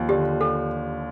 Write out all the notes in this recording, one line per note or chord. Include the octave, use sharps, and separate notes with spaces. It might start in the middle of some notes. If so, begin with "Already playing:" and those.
Already playing: D#2 F3
D3 G4
A4